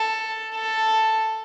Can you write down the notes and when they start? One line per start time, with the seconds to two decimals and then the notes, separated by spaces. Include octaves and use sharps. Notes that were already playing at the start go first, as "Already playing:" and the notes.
Already playing: A4
0.55 A4